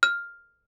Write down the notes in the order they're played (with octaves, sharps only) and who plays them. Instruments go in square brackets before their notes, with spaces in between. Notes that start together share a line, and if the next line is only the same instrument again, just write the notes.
[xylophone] F6